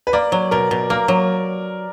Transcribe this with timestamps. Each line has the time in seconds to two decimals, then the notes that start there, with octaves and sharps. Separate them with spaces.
0.07 B4
0.13 A#3 D5
0.32 F#3
0.51 B2 A#4
0.71 B2
0.90 A#3 A#4
1.08 F#3